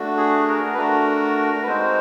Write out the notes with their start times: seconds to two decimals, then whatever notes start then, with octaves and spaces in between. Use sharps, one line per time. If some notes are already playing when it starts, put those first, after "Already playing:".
Already playing: A3 D4 F#4
0.17 G#4
0.48 A#4
0.73 B4
0.77 A3 D4 F#4 A#4
1.63 B4
1.67 G#3 C4 D#4 F#4 C5